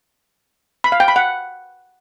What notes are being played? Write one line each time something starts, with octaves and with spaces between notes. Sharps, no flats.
B5
F5
G5
B5
F#5